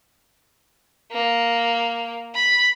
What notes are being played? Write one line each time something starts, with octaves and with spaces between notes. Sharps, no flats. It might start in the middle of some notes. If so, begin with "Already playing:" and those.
A#3
B5